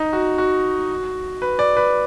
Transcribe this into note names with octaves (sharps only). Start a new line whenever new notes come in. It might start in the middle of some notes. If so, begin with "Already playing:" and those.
Already playing: D#4
F#4
F#4
B4
D5
B4